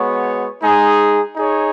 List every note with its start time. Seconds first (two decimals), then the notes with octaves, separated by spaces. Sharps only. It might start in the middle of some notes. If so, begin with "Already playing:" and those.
Already playing: G#3 B3 F#4 C#5
0.63 G#3 D#4 G#4
1.36 D#4 G#4 C#5